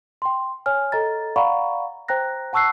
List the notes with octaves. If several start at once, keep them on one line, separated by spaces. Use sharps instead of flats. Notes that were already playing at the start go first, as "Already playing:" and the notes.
G5 C6
C#5 G#5 F6
A4 D#5 A#5 A6
D5 F5 F#5 A#5 B5 C#6
C5 G5 A#5 F#6 A#6
F#5 A5 C#6 E6 F#6 C7